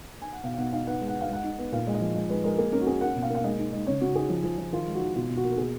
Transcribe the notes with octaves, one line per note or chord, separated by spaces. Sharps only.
G#5
F#5
B2 F5
F5
B2 F#5
D#4 F5
B3 F#5
G#3
F#5
D#4
F5
G#3 F#5
D#4
B3
A#2 F5
G#3
D#5
F3
G#3
G#3 B4
G#3 A#4
A#3 G#4
C#4 A#4
F#4
C#4 G#4
A#3 F#5
B2
F5
A#3
F5
G#3 D#5
D#4
G#3
C#3 C#5
C#3 F#4
D#4 G#4
F3
F3
F3
D#3 F4
G#3
F#4
D#3
B2 F4
B2
F#4
A#3
A#4
B2 G#4